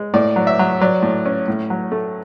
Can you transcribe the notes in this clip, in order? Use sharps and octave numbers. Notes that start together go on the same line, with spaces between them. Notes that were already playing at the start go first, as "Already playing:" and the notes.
Already playing: G#3
A2 D5
F#3
E5
F#3
F#3 D5
A2
C#4
A2
F#3
A3